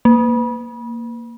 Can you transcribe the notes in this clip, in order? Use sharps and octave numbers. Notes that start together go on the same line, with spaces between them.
A#3